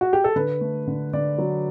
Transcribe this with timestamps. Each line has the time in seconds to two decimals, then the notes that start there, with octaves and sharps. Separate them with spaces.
0.01 F#4
0.13 G4
0.24 A4
0.36 D3 B4
0.61 A3
0.87 D3
1.13 D3 D5
1.38 F#3